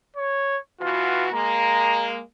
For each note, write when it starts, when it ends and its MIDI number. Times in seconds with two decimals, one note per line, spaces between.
0.16 0.58 73
0.81 1.30 47
0.81 1.30 52
0.81 1.25 65
0.81 1.30 66
1.32 2.20 56
1.32 2.20 58
1.32 2.09 82